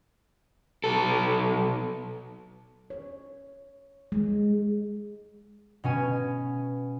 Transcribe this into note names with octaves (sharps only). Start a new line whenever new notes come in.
B1 A4
C#5
G#3
B2 C#4 G#5